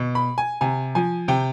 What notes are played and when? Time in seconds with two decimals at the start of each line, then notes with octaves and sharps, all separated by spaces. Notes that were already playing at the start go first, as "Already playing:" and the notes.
Already playing: B2
0.15 B5
0.38 G#5
0.61 C3 G#5
0.95 F3 G#5
1.28 C3 G5